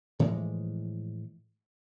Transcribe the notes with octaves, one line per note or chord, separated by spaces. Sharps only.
A2 E3 F3 G#3